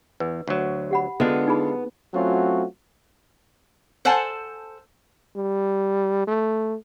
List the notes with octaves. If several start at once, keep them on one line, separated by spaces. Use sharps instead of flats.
E2 B4
D2 F#3
G4 F#5 B5
D3 G#3 B3 D4 F4
D#4 G#4 B5
F#3 A3 C4 C#4 F4 F#4
A4 C5 F#5 G#5 A5
G3
A3